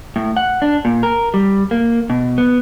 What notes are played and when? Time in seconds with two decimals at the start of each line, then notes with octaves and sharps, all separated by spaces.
0.16 A2
0.37 F#5
0.62 D4
0.85 A#2
1.03 A#4
1.34 G3
1.71 A#3
2.10 B2
2.38 B3